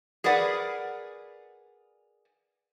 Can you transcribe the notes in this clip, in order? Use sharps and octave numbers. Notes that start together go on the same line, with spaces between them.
G#4 A#4 B4 D5 F#5